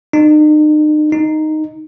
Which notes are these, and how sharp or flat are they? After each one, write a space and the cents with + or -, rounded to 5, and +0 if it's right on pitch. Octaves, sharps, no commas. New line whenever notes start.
D#4 -40
D#4 -5